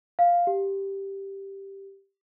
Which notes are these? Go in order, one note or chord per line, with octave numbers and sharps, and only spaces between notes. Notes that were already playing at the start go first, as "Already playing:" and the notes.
F5
G4